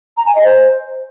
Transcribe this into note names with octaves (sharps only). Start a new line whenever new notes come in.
A#5
G#5
D#5
C5